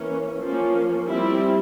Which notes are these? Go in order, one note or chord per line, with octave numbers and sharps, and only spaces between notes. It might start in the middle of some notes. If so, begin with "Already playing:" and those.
Already playing: E3 A#3 C#4
F3 A#3 C#4
G3 C4 E4